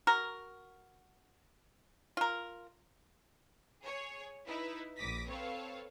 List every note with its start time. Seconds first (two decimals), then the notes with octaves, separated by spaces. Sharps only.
0.07 F#4 A#4
2.17 F4 A#4
3.83 G#4 C#5
4.47 D#4 E4 B4
4.97 A#1 D6 D#6 A#6 B6
5.29 C4 A4 B4 C#5 F5